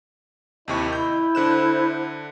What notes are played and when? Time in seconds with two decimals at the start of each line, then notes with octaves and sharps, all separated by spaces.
0.68 D#2 C3 E4 D#5 C#6
0.92 E4 G6
1.35 D3 C5 F#6 E7